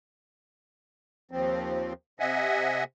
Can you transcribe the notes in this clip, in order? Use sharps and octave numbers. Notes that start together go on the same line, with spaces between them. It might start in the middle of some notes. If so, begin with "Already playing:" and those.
D#2 F3 C4
C3 D#5 E5 F#5 G#5